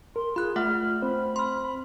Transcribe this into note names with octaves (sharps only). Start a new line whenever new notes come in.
A#4 C6
F4 G#4 B5 F#6
A3 E5 F#5 F6
C4 C5 B5
C6 F6